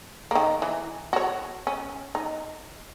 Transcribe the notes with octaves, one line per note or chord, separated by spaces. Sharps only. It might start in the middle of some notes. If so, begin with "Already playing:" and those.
D#3 A#3
E3
F#4 C#5
C#4
D#4